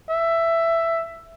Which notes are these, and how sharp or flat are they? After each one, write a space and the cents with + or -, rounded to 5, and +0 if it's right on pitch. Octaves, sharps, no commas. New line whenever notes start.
E5 +10